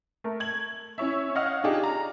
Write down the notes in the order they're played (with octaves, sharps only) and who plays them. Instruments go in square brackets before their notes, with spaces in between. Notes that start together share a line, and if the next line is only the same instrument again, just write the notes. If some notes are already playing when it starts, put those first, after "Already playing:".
[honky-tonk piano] A3 A#4
G#6 F#7
C#4 E4 C#5 E5
C#5 D#5 F5 F#5 C#6 F6
D4 D#4 F4 G4 G#4
A#5